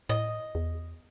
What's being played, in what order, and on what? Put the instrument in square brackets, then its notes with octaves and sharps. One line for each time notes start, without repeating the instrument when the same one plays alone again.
[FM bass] A2 [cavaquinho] D#5
[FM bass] E2